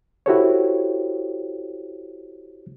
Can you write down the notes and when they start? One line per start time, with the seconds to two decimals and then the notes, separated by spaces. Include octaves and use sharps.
0.26 E4 F#4 G4 A4 C5 C#5